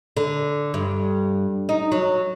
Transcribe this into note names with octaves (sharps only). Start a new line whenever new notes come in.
D3
G2
D#4
F#3